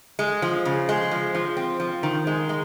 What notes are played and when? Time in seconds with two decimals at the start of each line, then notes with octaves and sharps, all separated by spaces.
0.19 G#3
0.42 F3
0.65 C#3
0.89 G#3
1.11 F3
1.35 F3
1.57 C4
1.80 F3
2.03 D#3
2.27 G#3
2.49 G#3